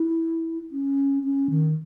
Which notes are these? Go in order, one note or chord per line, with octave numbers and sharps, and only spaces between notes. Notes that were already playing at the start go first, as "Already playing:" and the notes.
Already playing: E4
C#4
C#4
D#3